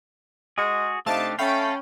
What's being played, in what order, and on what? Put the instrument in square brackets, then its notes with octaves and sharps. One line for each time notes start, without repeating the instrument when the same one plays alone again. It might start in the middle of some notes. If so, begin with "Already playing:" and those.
[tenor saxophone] G#3 [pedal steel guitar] F#4 G#4
[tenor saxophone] C3 [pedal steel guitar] A3 D4 G4 [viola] D#4 [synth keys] F5 A5 A6
[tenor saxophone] A3 [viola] C#4 [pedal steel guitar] F5 A5 [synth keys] G5 B5